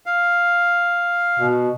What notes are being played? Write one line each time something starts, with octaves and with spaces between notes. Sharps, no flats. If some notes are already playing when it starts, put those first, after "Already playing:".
F5
B2